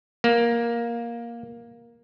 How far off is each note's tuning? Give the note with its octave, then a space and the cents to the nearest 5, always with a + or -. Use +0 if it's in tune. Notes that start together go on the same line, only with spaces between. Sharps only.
A#3 +10